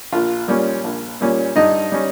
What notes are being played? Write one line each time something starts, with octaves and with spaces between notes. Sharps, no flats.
A#1 F4
A#2 G3 C#4
A#1
A#2 G3 C#4
G2 D#4 D#5
G3 C#4